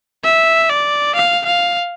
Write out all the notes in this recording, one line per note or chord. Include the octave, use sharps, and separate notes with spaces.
E5
D5
F5
F5